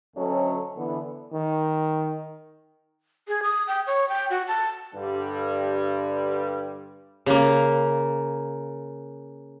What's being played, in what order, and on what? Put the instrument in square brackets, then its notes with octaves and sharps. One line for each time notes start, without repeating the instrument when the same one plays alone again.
[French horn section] D2 F#3 A3 C#4 A4 D#5
D3 E3 B3
[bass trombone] D#3
[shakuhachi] G#4
D#6
G5
C#5
G5
F#4
A5
[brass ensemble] G2 D3 G3
[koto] C#3 A#3